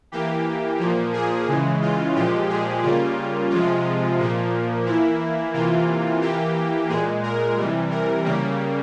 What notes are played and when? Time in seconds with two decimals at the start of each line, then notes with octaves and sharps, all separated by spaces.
0.12 E3 A#3 G4
0.79 A#2 F3 A#3
1.13 G#4
1.47 C#3 E3 G#3
1.82 F4
2.15 A#2 F3 G#3 G4
2.49 G#4
2.83 C#3 G3 A#3 F4
3.50 C3 F3 G#3 F4
4.18 A#2 F3 A#3
4.86 E3 A#3 E4
5.54 C3 E3 A#3 F4
6.21 E3 A#3 G4
6.89 A#2 G#3 G#4
7.23 A#4
7.57 C3 E3 G3
7.91 A#4
8.25 C#3 G3 A#3